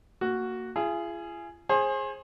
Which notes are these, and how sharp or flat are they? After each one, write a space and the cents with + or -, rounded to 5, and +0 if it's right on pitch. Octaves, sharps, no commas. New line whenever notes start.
A#3 -20 F#4 +0
F4 -45 G#4 +0
G#4 +0 C5 +35